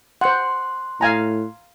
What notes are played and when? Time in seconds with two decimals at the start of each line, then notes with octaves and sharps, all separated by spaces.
0.21 C5 F#5 C6 F#6
1.01 A2 F5 G#5 A#5